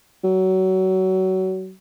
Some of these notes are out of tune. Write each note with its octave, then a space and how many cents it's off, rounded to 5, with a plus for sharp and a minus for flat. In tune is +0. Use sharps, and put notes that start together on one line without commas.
F#3 +25